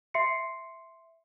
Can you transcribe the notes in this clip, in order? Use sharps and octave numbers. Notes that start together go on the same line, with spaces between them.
E5 C6 C7 C#7